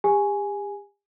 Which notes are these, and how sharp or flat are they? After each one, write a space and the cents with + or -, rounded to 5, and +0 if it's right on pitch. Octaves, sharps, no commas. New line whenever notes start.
G4 +40 G#5 +0